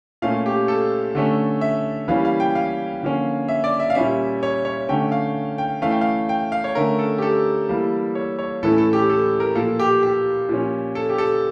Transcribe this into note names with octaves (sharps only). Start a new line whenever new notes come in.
A#2 A3 C#4 F5
G4
A4
D3 A3 C#4
E5
E3 G3 A#3 C#4 F5
F5
G5
F5
D3 F3 A#3 C#4
E5
D5
E5
F5
A#2 G3 C#4 E5
C#5
C#5
D3 A3 C#4 G5
F5
G5
E3 A3 C#4 F5
G5
F5
G5
F5
C#5
D3 A3 C#4 A#4
A4
G4
A4
E3 G3 A#3
C#5
C#5
A2 E3 A3 C#4 A4
A4
G4
A4
A#4
A#2 F3 A#3 A4
G4
G4
A#2 F3 C#4
A4
G4
A4